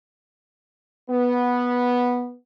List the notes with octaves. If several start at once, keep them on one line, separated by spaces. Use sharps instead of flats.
B3